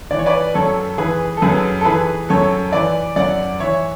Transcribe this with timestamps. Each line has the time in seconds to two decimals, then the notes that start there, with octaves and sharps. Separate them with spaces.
0.11 E3 D5
0.19 C#5
0.26 B4 D5
0.54 F#2 A4 C#5
0.98 E3 G#4 B4
1.37 A4
1.42 F#2 G#4 B4
1.81 A4
1.85 E3 G#4 B4
2.29 F#2 A4 C#5
2.73 E3 B4 D5
3.16 F#2 D5 F#5
3.60 E3 C#5 E5